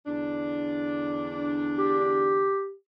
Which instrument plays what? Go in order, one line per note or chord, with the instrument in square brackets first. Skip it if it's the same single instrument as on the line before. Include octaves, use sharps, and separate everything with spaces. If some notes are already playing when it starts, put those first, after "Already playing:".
[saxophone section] E2 D3 D4
[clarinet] G4